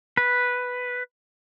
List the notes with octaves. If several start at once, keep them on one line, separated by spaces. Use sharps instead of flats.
B4